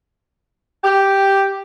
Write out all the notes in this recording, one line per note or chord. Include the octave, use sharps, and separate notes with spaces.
G4